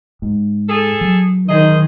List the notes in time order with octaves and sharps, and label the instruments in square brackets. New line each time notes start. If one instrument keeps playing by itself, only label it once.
[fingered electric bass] G#2
[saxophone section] G#4 A4
[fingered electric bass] F#3
[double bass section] D#3 [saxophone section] G#4 C5 D#5